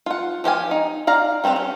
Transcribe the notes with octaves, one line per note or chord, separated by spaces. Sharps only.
F4 F#5
F3 G4 F5 G#5
D#4
D5 F5 A#5
G3 C4 E4 G4 B4
C#4